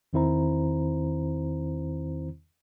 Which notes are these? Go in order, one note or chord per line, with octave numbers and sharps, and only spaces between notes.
E2 D#3 C4 E4 C5 A#5